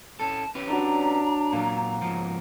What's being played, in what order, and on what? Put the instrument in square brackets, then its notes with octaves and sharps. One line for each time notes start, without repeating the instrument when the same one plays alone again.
[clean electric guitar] C#4 A4 [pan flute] A5
[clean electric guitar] C#4 G4 B4
[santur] F#3 D5 C6 [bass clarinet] D4 [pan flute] A#5
[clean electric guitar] A#2 F#3 [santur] A#3
[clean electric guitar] G#2 F3